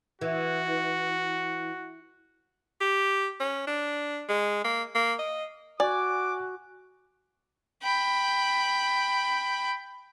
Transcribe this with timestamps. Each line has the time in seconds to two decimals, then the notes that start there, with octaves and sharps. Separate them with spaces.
0.21 E3 F#4
2.81 G4
3.40 C#4
3.67 D4
4.29 G#3
4.64 A#3
4.95 A#3
5.19 D#5
5.80 F#4 D5 G#5 D6
7.83 G5 B5